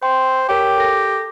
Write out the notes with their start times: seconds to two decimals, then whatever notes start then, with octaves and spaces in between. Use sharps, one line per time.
0.02 C5 G5 C6
0.49 G4 A#4 C#5 G5
0.78 A4 A#6